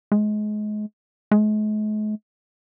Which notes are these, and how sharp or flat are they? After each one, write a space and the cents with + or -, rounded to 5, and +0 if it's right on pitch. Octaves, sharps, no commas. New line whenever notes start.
G#3 +30
G#3 +45